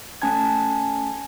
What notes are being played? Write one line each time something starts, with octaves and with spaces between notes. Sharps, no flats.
A3 C#4 G#5 A5 G#6